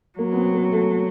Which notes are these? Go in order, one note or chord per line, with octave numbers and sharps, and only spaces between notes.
F#3 A#3
B3
C4
A#3
A3